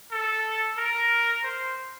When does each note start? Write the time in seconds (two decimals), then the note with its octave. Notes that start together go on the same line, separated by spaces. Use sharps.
0.11 A4
0.78 A#4
1.43 C5